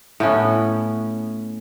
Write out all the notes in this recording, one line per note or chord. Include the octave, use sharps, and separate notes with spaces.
A2 B3 C#4